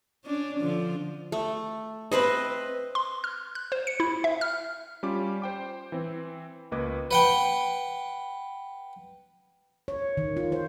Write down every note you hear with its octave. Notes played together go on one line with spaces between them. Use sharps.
C#4 D4
D3 F3
A3
C4 B4 C5 D#5
C6
F6
F#6
C5
C#7
E4
E5
F6
G3 C#4 F4 D6
C5 G5 D6
E3 C4
C#2 A#3 B4 D#5 D6 G#6
B4 F#5 G5
C#5
D#3
F4
C5